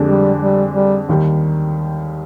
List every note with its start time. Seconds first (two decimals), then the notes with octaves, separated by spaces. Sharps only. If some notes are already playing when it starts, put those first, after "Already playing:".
Already playing: F2 D3 G#3 D4 G4
0.09 G3
0.42 G3
0.75 G3
1.09 D#2 D#3 G3